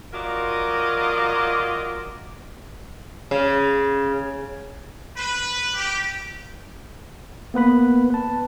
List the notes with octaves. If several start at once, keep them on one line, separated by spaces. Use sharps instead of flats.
F#3 F4 A#4 D5 D#5
C#3
B4
G4
A#3 B3 B4 B5
B4 A5